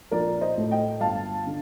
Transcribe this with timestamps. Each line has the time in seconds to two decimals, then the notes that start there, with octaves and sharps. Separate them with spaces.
0.11 A#1 A#4 D5
0.41 C5 D#5
0.57 A2 A3
0.71 D#5 G5
1.00 G1 F5 A5
1.47 D3